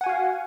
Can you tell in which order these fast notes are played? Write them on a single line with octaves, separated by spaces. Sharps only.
F#5 G#5 F#4 F5